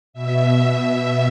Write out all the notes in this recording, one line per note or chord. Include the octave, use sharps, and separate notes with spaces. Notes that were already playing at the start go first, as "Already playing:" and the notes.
B2 E5